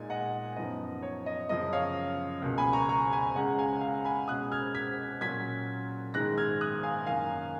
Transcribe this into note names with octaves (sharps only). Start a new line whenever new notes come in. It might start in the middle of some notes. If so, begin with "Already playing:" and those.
Already playing: A#2 G#3 D#4 G#5
D#5 F#5
F#2 F3 B3 D#4 D#5
C#5
D#5
F#2 C#3 F3 D#5
C#5 F5
C#2 B2 A#3 C#4
G#5 B5
A#5 C#6
A#5 C#6
G#5 B5
C#2 C#3 G#3 C#4 F#5 A#5
F5 G#5
F5 G#5
G#5 B5
B2 G#3 C#4 D#6 F#6
F6 G#6
G#6 B6
A#2 F#3 C#4 G#6 B6
G#2 D#3 G#3 F#6 A#6
F6 G#6
D#6 F#6
F5 G#5
F#2 D#3 A#3 C#4 F5 G#5